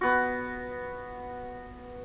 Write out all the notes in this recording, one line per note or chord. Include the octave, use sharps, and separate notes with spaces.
B3 F#4